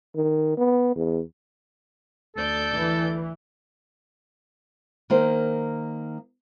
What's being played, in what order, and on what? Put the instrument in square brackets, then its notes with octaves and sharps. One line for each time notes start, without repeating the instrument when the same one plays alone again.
[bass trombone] D#3
B3
E2
[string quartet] D2 D5 G6 [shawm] A4
[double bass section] E3
[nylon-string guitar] D#3 A#3 C5